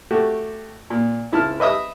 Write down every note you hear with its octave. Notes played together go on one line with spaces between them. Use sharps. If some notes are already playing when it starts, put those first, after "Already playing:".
A3 F#4 G4
A#2
C#2 E4 A5 F6
B4 D#5 E5 D#6 E6